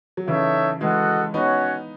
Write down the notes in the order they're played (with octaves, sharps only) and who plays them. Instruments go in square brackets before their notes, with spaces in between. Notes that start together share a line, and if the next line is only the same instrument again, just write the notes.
[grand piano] F#3
[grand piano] C#3 E3 [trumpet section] D#4 A4 C#5 E5
[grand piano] E3 G#3 [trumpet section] F#4 A4 D#5 F#5
[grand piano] B3 D#4 [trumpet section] C#4 F#4 C#5 F#5